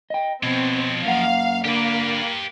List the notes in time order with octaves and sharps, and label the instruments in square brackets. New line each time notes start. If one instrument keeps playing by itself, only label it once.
[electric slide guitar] D#5 G5
[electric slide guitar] B2 [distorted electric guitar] F3 C#5 [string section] C4
[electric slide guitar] F#2 A#3 F#5 [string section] F5
[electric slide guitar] D3 [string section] A#3 [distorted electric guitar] G4 B4